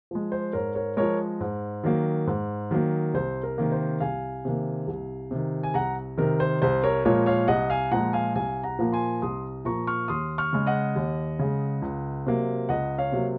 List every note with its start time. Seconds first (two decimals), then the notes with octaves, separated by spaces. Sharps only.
0.11 F3 G#3
0.32 C5
0.53 G#2 A#4 C#5
0.75 A#4 C#5
0.97 F3 G#3 A#4 C#5
1.40 G#2
1.84 D#3 F#3 A#3
2.27 G#2
2.71 D#3 F#3 A#3
3.14 C2 C5
3.43 A#4
3.58 C3 D#3 A#3
3.72 C5
4.00 C2 F5 G#5
4.45 C3 D#3 A#3
4.87 C2
5.31 C3 D#3
5.63 G#5
5.74 C2 F#5 A#5
6.18 C3 D#3 A#4
6.40 C5
6.62 C2 C5
6.84 A#4 C#5
7.05 A#2 F3 G#3 A#4 C#5
7.26 C#5 F5
7.48 C2 D#5 F#5
7.70 F5 G#5
7.91 A#2 F3 G#3 F#5 A#5
8.13 F5 G#5
8.35 C2 F5 G#5
8.63 F#5 A#5
8.78 A#2 F3 A#3
8.92 G#5 C6
9.22 C2 C6 D#6
9.65 A#2 F3 A#3 A#5 C#6
9.87 C#6 F6
10.08 D#2 C6 D#6
10.38 C#6 F6
10.53 C#3 G#3
10.67 D#5 F#5
10.95 D#2
11.39 C#3 G#3
11.82 C#2
12.26 C3 F#3 A#3
12.69 C#2 D#5 F#5
12.98 C#5 F5
13.12 C3 F#3 A#3